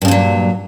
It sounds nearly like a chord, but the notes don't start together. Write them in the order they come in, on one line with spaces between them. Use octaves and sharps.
G2 C#3 A#2 F#3